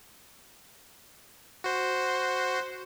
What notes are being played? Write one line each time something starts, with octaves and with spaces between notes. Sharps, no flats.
F#4 C5